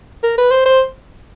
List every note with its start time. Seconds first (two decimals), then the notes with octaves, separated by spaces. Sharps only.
0.23 A#4
0.38 B4
0.51 C5
0.66 C5